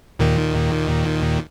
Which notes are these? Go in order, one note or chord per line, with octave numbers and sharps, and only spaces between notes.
D#2 A#2 D#3